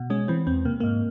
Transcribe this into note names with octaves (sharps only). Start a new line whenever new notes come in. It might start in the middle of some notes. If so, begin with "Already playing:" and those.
Already playing: B2
G#3 C#4
E3 C4
E2 C4
C3 A#3
G#2 A#3